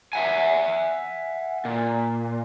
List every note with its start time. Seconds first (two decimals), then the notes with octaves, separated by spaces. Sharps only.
0.13 E5 F#5 G#5
1.65 A#2